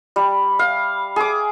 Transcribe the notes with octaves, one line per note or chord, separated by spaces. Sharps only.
G3
F5
G#4 D6